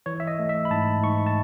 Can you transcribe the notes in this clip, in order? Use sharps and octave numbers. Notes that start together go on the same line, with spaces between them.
E3 C#5
E5
D#5
A3
E5
B5
G#2 A5
G#2 C#6
A5